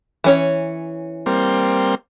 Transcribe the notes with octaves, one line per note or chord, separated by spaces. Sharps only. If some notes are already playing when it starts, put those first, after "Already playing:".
E3 C#4 C#5
G3 A#3 C4